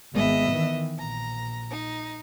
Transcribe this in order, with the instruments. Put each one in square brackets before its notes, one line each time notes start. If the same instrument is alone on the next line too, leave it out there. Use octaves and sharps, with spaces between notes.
[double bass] G#1 G#3 [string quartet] B3 D#5 E5
[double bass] D#3 E3
[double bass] A#1 [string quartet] A#5
[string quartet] D#4